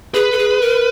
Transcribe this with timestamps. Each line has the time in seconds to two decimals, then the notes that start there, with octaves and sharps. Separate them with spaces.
0.14 G#4 B4
0.32 A4
0.38 G#4
0.62 A#4